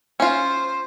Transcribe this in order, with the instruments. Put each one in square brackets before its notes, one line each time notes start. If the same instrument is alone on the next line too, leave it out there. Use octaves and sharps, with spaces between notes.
[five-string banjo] C#4 F4 [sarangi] C5